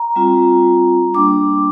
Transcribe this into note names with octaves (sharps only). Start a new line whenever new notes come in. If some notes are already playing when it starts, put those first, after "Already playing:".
Already playing: A#5
G3 C4 F4
G3 A#3 D4 D6